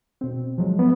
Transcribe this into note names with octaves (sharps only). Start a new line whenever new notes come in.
B2 C4
F3 F#3 G#3
B3